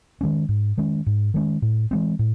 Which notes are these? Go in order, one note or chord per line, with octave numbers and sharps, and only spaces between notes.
D#3 G#3 C#4
G#2
D#3 G#3 C#4
G#2
D#3 G#3 C#4
A2
E3 G#3 C4
A2